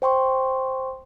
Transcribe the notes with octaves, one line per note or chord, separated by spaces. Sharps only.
C5 G5 C6 C#6